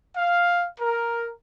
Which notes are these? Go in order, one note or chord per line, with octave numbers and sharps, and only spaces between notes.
F5
A#4